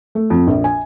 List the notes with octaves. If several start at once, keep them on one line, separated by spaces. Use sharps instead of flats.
A3
F2
A#1
G#5